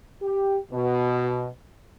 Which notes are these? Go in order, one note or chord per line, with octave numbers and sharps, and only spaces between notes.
G4
B2